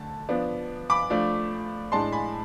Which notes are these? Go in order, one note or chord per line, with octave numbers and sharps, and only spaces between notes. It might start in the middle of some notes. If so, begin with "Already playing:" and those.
Already playing: D3 A3 A5
F3 B3 D4
B5 D6
F3 A3 D4
A2 G#3 D4 A5 C6
G#5 B5